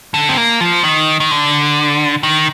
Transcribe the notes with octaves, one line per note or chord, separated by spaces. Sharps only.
D3
C4
A#3
F3
D#3
D#3
D3
D#3